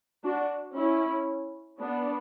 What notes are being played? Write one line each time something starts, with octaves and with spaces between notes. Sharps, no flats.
D4 F#4
C#4 E4
B3 D4